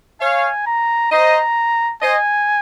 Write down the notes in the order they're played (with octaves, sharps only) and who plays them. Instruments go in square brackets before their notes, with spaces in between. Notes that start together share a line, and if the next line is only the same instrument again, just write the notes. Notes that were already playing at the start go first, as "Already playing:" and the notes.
[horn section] C#5 F5 [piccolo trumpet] G#5
[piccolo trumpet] A#5
[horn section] C5 D#5 [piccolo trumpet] A#5
[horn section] C5 D#5 [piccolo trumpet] G#5